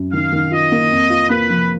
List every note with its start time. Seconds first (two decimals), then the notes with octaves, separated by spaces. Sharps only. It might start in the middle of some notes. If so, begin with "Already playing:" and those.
Already playing: F#2
0.12 D#3 F5
0.32 D#3
0.51 F4 D#5
0.72 A#3
0.92 F2
1.10 F4
1.30 A#3 B4
1.50 F3